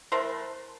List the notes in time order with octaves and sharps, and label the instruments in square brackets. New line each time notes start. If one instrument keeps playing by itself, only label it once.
[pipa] E3 A3 A#4 C5